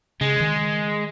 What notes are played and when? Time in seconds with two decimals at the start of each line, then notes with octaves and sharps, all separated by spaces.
0.21 C#3 G#3
0.40 D#3